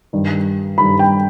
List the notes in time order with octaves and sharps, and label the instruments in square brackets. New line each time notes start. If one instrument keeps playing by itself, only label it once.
[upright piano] G2 D#3 G3
G2 D#3 G3 B5
G5